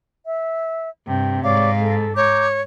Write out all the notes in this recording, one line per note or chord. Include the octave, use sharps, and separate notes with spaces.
E5
G2 C3 G5
G#2 C#5 D5 F5 D6
A4
C#5 A#5 D6 G6